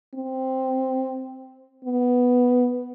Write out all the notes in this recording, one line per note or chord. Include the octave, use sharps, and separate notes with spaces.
C4
B3